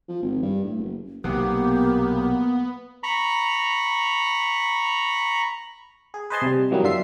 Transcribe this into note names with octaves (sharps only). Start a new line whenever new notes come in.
F3
G#1
G2
A2
F#1
B1 C3 A#3 B3 G4
A#5 B5 C#6
G#4
B4 C5 D#5 G#5 A5 C6
C3 G3
E3 F#3 G3 A#3 B3 D#4
F#2 D3 D4 F4 E5 C7